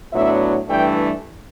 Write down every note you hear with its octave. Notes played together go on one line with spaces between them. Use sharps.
A2 F#3 B3 D4 E5
G2 E3 A3 D4 G5